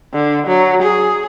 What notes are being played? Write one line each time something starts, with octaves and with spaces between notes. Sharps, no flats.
D3
F#3
G#4